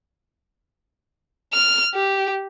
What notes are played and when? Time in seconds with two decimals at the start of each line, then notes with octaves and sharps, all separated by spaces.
1.53 F6
1.94 G4